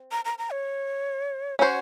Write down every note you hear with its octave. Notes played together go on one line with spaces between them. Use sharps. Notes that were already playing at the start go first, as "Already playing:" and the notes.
Already playing: C4
A#5
A#5
A#5
C#5
C#4 F#4 C5 C#5